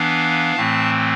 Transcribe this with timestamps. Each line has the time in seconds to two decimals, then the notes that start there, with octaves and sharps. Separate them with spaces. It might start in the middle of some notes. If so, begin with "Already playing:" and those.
Already playing: E3 B3 D4 F5
0.56 A2 E3 A3 C4 A5